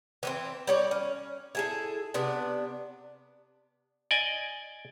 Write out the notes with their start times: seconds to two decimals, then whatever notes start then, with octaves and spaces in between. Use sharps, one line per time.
0.23 E3 B3 C4
0.67 G3 C#5 D5
0.91 C#4
1.55 E4 G#4 A4
2.14 C3 B3 D4
4.11 D5 D#5 G#5